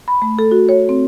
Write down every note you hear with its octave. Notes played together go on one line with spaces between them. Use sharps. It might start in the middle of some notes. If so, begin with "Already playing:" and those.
B5
A3
A4
F#4
C#5
C4